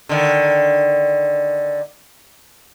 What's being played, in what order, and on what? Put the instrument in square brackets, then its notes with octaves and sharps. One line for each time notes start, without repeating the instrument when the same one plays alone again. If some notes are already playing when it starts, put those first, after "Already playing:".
[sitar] D3 D#3